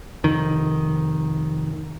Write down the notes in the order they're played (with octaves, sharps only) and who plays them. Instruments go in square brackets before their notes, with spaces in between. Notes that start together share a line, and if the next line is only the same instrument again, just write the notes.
[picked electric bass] F1 D#3